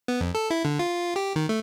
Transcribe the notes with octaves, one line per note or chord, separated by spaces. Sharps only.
B3
F2
A4
E4
D3
F4
G4
D#3
A3